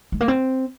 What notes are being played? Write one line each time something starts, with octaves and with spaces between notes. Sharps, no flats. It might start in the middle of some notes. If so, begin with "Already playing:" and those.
G#3
A#3
C4